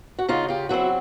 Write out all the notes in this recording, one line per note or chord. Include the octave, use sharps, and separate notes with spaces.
F#4
C#3 D#4 F4
F4 G4
F#3 A3 C4 E4 F#4